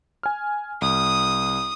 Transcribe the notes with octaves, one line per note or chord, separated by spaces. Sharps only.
G#5 F6
C2 D#6